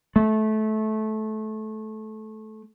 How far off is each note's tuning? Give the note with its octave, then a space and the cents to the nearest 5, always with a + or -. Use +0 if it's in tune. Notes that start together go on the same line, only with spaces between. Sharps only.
A3 -20